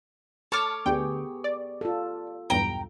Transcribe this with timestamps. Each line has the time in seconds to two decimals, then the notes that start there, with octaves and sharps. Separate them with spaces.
0.52 A4 C#5 A5 C#6 D6 F6
0.86 D2 D3 B3 G4 G#4 G5
1.44 D5
1.81 F4 A4
2.50 B1 E2 G2 G5 A#5